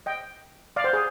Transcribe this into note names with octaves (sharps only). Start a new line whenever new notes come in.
D#5 G5
D5 F5
C5
G#4